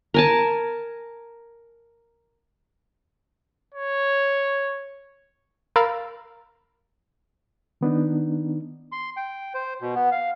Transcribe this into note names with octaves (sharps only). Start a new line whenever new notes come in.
A#4 G#5 A5
C#5
A#4 F5 A#5 B5 E6 A6
D#3 B3 D4 D#4
C6
G5
C5
B2
B3
F5